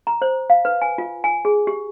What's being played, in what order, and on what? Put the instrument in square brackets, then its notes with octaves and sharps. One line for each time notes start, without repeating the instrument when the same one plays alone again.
[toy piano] A#5
C5
F5
B4
G#5
F4
G#5
G#4
G4